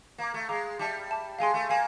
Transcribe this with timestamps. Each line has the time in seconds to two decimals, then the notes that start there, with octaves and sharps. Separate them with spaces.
0.18 A#3 F5 A#5 D6
0.34 A3
0.49 G#3 F5 A#5 D6
0.79 G3 E5 A5 D6
1.10 E5 A5 D6
1.39 G#3 F5 G#5 C6
1.54 A3
1.69 A#3 F5 G#5